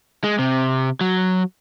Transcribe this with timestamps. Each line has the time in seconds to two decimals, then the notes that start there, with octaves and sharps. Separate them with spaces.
0.24 G#3
0.39 C3
1.01 F#3